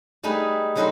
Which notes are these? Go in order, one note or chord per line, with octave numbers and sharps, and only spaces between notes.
G3 A3 D#4 G#4 B4
F#3 G3 D#4 A4 B4 C5